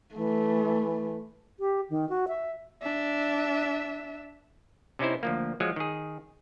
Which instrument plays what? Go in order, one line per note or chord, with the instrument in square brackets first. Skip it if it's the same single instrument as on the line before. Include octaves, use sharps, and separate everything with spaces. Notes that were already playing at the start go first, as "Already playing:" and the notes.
[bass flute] E3 [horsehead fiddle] A3
[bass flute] G4
D#3
F#4
E5
[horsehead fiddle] D4 E5
[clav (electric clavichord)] C3 C#4 D#4 E4 C5
D2 F3 A#3
F3 F#3 G#3
D#3 G#4